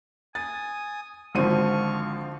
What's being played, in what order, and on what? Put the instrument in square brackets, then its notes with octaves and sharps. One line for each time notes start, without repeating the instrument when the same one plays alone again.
[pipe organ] G#5 D#6 [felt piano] A6
[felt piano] G#1 D#7 [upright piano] D3 F3 C4 [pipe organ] F5 C#6